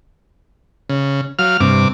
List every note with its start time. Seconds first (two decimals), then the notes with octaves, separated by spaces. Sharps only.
0.89 C#3
1.39 F#3 F5 F6
1.60 G2 C3 D6